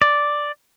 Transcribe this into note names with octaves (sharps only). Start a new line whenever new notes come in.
D5